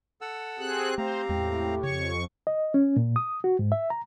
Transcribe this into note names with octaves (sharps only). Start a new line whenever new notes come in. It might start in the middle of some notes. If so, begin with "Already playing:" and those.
A4 F#5 E6
C4 G4 G#4 F#6
A3 C4 C5 F5 A#5
E2 A2 G#3
F2 C#3 C#5 C#6
D#5
C#4
A#2
D#6
F#4
G#2
E5
A#5